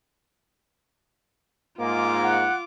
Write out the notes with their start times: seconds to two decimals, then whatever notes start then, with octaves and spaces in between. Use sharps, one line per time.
1.80 G#2 A#3 F4 D6
2.23 F#5